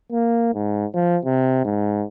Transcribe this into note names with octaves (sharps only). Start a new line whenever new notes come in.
A#3
G#2
F3
C3
G#2